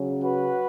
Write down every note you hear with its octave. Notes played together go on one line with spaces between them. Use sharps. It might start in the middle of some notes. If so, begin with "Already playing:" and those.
Already playing: C#3 F#3 C#4
F#4 B4